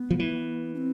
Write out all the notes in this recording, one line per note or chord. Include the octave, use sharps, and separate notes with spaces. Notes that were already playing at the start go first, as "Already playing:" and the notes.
Already playing: B3
F3
E3
D4
C4